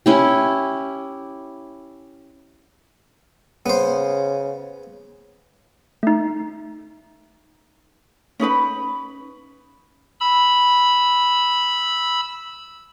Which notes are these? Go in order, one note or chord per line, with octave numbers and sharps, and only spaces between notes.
C#4 E4 G4
C#3 B3 C5
A3 D#4
C#4 D#4 B4 B5
B5 E6